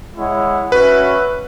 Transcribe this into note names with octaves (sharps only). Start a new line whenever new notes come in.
G#3 E4 C#5 F#5
C#4 F#4 B4 C#5 E5